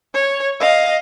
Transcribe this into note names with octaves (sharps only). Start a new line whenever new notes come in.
C#5
D#5 F5